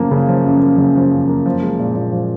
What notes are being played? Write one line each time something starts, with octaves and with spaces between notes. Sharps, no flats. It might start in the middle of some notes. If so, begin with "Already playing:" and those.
Already playing: F#2 C#3 F3 A#3
C#3
F3
F#2
A#3
C#3
F3
F#2
A#3
F3
G#3
A#2
A#2
F3